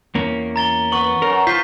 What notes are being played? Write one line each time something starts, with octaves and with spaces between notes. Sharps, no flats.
E2 A#3 C#4
A#5 A6 G7
B3 C#6 F#7
F#2 A#4
F3 F4 G6 B6